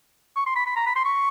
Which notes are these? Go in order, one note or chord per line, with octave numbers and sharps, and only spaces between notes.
C#6
C6
B5
B5
A#5
B5
C6
C#6